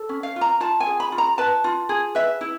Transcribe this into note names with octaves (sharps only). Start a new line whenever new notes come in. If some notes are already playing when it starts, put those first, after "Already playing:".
Already playing: A4
C#4
F5
F4
A#5
F4 A5
G#5
G#4
B5
F4
A#5
B4 A5
F4
G#4
B4 E5
E4